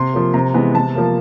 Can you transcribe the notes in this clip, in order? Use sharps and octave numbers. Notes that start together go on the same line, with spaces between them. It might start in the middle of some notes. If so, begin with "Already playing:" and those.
Already playing: C3 C6
F3 A#3
C3 A#5
E3 G#3 B3
C3 A5
F3 A#3